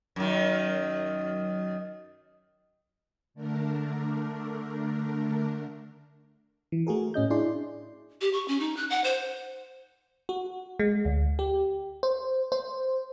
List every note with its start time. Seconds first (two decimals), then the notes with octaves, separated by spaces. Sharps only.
0.16 F#2 D#3
3.34 D3 A3 D4 A#4
6.72 E3
6.87 A3 F#4 G#4 A#4
7.14 A2 C#4 D#5 G6
7.30 D4 E4 G#4 D5 C6
8.21 G4
8.33 C#6
8.48 C#4
8.60 D#4
8.77 F#6
8.90 F#5
9.04 C5
10.29 F#4
10.79 G#3
11.05 D2
11.39 G4
12.03 C5
12.52 C5